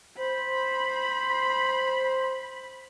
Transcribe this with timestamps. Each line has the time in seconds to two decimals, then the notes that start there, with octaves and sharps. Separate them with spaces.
0.18 C5 B5